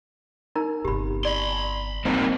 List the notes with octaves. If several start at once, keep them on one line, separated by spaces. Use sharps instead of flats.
D#4 A#4 A#5
G1 C3 G4 B5
D5 B5 C6
G3 A#3 C4 D#4